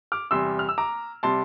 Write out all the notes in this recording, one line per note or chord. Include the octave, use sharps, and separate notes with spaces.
D6 F6
E2 C3 G3 C6 E6
F6
E6
A#5 D6
C3 G3 A5 C6